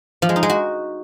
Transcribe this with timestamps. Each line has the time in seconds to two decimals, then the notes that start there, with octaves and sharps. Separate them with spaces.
0.22 F3
0.29 G#3
0.36 D#4
0.43 G#3
0.50 F#4